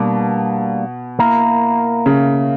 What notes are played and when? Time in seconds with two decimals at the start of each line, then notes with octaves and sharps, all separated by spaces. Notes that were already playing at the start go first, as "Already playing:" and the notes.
Already playing: B2 G3 A#3 D4
1.19 A#3 E4 A#4
2.06 C#3